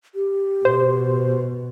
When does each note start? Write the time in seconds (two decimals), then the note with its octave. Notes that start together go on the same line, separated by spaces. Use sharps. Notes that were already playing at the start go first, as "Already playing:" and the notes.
0.15 G4
0.65 B2 C5